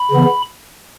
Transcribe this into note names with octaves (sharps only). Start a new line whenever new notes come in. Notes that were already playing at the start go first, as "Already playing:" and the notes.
Already playing: B5
C#3 E3 B3